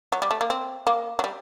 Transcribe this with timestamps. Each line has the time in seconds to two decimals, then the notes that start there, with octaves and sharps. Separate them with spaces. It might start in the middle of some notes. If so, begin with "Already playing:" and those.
0.12 F#3
0.22 G3
0.31 A3
0.41 A#3
0.50 C4
0.87 A#3
1.19 F#3
1.24 G3